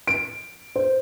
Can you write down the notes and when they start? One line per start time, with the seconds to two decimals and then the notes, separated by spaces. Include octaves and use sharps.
0.07 D7
0.76 C5